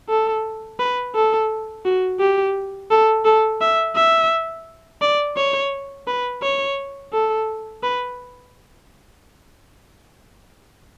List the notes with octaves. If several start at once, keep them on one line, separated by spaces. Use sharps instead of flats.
A4
B4
A4
F#4
G4
A4
A4
E5
E5
D5
C#5
B4
C#5
A4
B4